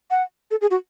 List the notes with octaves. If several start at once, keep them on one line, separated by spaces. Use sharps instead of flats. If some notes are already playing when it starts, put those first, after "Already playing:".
F#5
A4
G#4
F#4